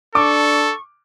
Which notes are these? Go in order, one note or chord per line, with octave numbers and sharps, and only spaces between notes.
D4 A4 C#6 D6